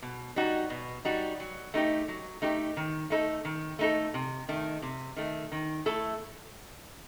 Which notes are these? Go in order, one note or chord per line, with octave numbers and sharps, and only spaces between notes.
B2
G3 D#4 F#4
B2
G3 D#4 F#4
F#3
A3 D#4 G4
F#3
A3 D#4 G4
D#3
A3 D#4 A4
D#3
A3 D#4 A4
C3
D#3 A3
C3
D#3 A3
D#3
A3 E4 A4